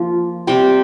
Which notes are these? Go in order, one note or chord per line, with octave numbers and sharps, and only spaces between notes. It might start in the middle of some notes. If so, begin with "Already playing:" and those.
Already playing: F3 A#3 F4
C3 G3 C4 G4